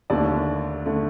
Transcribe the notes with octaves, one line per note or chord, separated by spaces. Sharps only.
D#2 D3 A3 D5
D3 A3